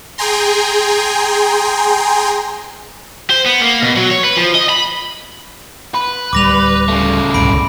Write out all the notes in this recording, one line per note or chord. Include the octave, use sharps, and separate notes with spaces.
G#4 G5 G#5 A#5 C6
C5
B3
A#3
B2
F#3
C#5
B4
F3
D#5
B5
B4
D1 G3 D6 A#6 F7
C#3 A3
D1 C2 G2 B5 D7